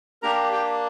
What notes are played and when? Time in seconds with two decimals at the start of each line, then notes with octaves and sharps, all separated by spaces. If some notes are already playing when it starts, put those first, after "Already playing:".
0.23 A#3 D4 G4 A#4 A#5
0.53 G4 G5